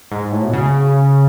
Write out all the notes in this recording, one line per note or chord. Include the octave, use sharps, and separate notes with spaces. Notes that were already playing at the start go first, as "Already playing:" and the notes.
G#2
A2
B2
C#3